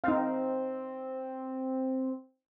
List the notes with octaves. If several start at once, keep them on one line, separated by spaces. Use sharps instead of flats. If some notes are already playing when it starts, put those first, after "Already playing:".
C4 D#4 F5